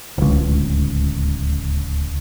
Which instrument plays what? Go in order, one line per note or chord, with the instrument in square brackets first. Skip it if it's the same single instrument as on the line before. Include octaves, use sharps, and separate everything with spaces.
[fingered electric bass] D1 C#2